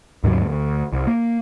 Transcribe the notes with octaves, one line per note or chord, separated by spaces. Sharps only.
D#2 G#2 C#3 F#3
D2
C2
A#3